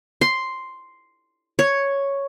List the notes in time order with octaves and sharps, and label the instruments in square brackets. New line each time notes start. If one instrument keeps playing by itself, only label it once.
[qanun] C6
C#5